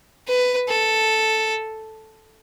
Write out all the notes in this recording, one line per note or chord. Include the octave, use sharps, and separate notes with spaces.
B4
A4